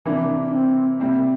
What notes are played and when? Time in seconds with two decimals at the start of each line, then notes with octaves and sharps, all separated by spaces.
0.05 C3 E3 A#3 D4 E4
0.42 D4
0.53 C4
1.00 C3 G3 A#3 C4 E4